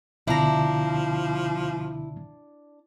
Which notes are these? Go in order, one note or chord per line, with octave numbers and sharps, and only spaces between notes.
C#2 B2 D3 F3 D4 E4 A#5